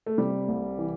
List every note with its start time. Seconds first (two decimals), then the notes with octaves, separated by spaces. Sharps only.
0.06 A3
0.18 C3 G3
0.48 C2
0.78 E3